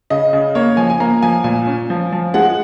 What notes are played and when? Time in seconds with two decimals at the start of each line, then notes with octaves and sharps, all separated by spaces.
0.10 C#3 D#5
0.33 C#3
0.55 A#3 C#5
0.77 F3 G#5
0.90 G#5
1.00 A#3 A#5
1.22 F3 G#5
1.44 A#2 G#5
1.67 C#4
1.90 F3
2.12 F3
2.34 G#3 F#5